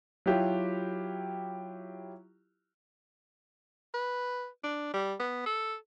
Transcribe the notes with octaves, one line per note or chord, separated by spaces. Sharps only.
F#3 E4 F4 G4
B4
D4
G3
B3
A4